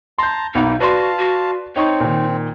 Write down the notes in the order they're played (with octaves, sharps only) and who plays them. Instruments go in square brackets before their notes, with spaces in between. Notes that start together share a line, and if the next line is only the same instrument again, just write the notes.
[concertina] A5 A#5 [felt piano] C6 G6
[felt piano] B1 B2 F#5 [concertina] A#3 E4 [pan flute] D#4
[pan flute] F#4 [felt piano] B4 D5 C6 [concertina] F5 A5
[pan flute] F#4
[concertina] C4 [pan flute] D#4 [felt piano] C#5 D#5 C#6
[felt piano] A#2 D#3